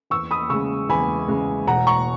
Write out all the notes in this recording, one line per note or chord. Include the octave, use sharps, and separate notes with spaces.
E2 C#6 E6
B5 D#6
C#3 G#3 C#6 E6
E2 G#5 B5
C#3 G#3
E1 F#5 A#5
A#5 C#6